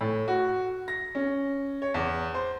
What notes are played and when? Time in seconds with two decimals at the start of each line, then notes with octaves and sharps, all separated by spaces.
0.01 A2
0.28 F#4
0.88 A#6
1.15 C#4
1.82 C#5
1.94 E2
2.34 C5